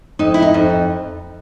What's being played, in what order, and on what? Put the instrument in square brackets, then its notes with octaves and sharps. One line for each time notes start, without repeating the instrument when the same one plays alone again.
[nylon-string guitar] F2 D#4
E4
D#4
F2